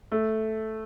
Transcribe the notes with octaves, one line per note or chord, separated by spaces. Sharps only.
A3